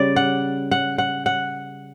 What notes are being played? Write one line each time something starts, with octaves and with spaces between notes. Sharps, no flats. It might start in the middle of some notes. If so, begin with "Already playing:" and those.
Already playing: C#3 G3 D5
F#5
F#5
F#5
F#5